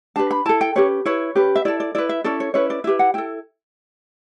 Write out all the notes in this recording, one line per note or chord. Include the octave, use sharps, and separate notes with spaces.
D4 G4 B4 A5
B5
E4 A4 A5
G5
C#4 G4 B4 C#5
E4 B4 C#5
C#4 G4 B4
E5
E4 A4 D5
D5
E4 B4 D5
E5
C#4 E4 A4 D5
C#5
C#4 E4 B4 C#5
D5
E4 G4 B4 E5
F#5
E4 A4 G5